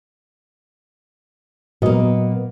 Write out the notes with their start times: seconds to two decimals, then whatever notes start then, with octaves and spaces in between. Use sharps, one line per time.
1.82 A#2 F#3 A#3 B3 D#5